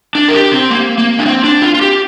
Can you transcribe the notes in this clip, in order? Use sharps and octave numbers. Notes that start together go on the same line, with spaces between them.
D4
A#4
G4
C4
A#3
A#3
D4
C4
D4
F4
F4
G4